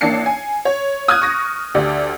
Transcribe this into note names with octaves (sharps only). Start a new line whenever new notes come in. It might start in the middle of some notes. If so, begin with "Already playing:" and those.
A1 A#3 D4 A5 C7 C#7
G#5
C#5
D#6 F6 F#6 G#6
C#6 A#6
D2 G4 D5